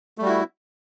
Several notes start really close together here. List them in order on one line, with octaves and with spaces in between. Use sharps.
A3 G3 F#4 E4